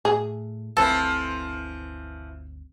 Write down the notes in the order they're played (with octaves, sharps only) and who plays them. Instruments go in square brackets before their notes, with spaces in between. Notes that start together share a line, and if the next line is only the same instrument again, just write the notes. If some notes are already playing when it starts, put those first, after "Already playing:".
[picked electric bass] A2 [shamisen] G#4
[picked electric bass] G1 D2 C4 [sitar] E3 F3 E4 [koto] A4